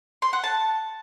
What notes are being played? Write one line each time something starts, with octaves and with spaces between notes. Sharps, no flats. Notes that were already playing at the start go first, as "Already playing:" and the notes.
C6
F#5
A5